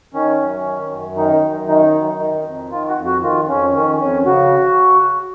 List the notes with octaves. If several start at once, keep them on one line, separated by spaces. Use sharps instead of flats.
D#3 C#4
F#2
D#3
F#2
D#3 D#4
F#2
D#3 D#4
F#2
D#3
F2
D#3 F4
F#4
F2
F#4
D#3 F4
F2 C#4
D#3 C#4
F2 C#4
C#3 F#4